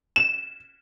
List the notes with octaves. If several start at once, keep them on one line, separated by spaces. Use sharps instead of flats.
E7